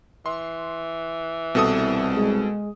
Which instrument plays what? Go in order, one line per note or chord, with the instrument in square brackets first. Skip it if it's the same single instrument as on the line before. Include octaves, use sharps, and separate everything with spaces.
[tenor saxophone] E3 [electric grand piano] C6
[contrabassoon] C2 [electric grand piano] B2 A4 D#6
[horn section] G#3